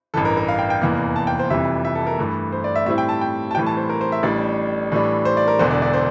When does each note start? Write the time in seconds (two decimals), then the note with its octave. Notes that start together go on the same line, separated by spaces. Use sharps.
0.14 A1 G2 E3 A4
0.25 A#4
0.37 A#4
0.48 F5
0.59 G5
0.70 G5
0.82 F1 E2 E3 A#3
1.16 A5
1.27 G5
1.39 C5
1.50 F1 F2 C3 E3 G3 E5
1.85 E5
1.95 A4
2.07 A#4
2.18 G2 E3 A3
2.52 C5
2.64 D5
2.76 E5
2.86 A2 G3 C4 E4 E5
2.98 G5
3.09 A5
3.21 G5
3.51 A5
3.55 A2 E3 G3 G5
3.66 A5
3.77 C5
3.89 A#4
4.01 C5
4.12 E5
4.23 A1 A2 G3 D4 D5
4.92 A2 E3 G3 D4
5.25 C5
5.37 D5
5.48 A#4
5.59 E1 E2 D3 C5
5.71 D5
5.82 D5
5.93 C5